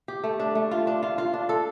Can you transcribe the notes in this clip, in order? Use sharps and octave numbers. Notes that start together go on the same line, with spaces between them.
G4
A3
D4
A3
F4
D4
F4
F4
D4
A4